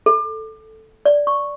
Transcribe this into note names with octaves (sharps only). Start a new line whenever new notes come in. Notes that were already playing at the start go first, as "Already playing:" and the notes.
A4
D5
C#6